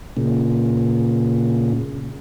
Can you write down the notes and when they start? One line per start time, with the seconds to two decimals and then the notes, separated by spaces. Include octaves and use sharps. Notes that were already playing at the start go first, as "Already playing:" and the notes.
0.17 A#2 C#3